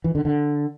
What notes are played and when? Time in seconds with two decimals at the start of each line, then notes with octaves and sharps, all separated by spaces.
0.04 E3
0.15 D3
0.25 D3